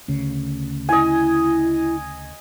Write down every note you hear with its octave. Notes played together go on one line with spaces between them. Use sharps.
D2 C#3
E4 D#5 G#5